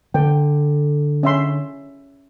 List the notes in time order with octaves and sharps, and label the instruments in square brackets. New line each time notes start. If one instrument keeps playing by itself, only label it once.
[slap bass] D3 [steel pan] G5
[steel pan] C#4 E5 C6